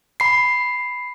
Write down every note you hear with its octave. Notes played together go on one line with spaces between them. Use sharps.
B5 C7